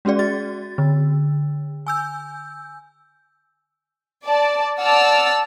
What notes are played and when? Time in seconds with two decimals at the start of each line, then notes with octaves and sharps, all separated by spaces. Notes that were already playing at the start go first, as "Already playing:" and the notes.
0.05 G#3 C#4 F#4 G#4 D5
0.19 F#4 A6
0.78 D3
1.87 G#5 E6 G6
4.26 D5 A5
4.80 D5 F#5 A5 E6 F6